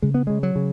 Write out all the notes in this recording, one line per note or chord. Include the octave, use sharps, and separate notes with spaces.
C#3 G#3
B3
C#3 G#3
F#3
C#3